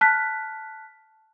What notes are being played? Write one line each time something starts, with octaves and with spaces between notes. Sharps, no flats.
A5 F6 F#6 B6